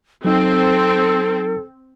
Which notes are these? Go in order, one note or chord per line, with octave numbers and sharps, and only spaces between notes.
F#3 C4 D#4 A4